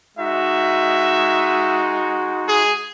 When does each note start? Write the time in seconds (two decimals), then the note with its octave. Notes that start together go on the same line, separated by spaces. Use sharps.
0.17 G#3 D#4 F#4 E5
2.47 G#4